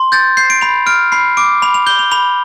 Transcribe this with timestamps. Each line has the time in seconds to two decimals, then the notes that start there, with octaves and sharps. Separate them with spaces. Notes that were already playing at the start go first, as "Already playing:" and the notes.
Already playing: C6
0.12 G6 A6
0.37 G6 C7
0.50 D7
0.61 B5 F7
0.86 F6 D7
1.12 B5 C7
1.37 D6 D7
1.62 B5 F7
1.74 F7
1.86 G6 G7
1.99 F7
2.12 B5 F7